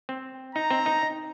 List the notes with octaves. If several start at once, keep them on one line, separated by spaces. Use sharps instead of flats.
C4
D#4 A#5
C4
D#4